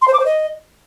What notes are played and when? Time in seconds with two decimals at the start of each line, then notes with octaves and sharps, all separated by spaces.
0.02 C6
0.08 C5
0.13 D6
0.19 C5
0.25 D#5